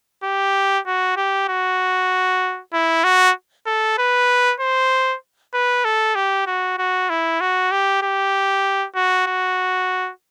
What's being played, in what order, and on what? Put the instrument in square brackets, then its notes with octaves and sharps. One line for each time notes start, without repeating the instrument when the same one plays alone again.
[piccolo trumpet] G4
F#4
G4
F#4
E4
F#4
A4
B4
C5
B4
A4
G4
F#4
F#4
E4
F#4
G4
G4
F#4
F#4